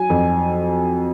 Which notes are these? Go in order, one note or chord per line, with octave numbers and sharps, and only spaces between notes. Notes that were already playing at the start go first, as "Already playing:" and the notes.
Already playing: F#3 G#5
F2